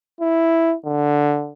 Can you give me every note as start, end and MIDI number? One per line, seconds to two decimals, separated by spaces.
0.21 0.74 64
0.85 1.52 50